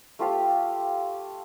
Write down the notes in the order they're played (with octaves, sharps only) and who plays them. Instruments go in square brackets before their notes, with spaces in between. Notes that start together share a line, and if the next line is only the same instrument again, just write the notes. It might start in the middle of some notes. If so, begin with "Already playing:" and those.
[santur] A3 F4 G4 F5